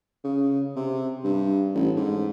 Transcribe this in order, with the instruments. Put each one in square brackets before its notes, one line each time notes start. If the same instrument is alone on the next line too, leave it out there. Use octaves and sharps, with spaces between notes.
[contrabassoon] C#3
C3
G2
A1
G#2